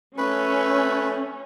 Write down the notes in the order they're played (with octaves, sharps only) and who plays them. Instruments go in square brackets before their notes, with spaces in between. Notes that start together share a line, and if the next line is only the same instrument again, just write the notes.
[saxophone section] F3 A3 [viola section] C#4 [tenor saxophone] B4